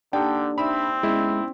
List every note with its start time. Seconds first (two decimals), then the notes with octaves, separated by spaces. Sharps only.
0.13 D3 A#3 D4 D#4 G4 G5
0.58 C4 D#4 D5 E5 B5
1.03 G#3 B3 C#4 E4 D5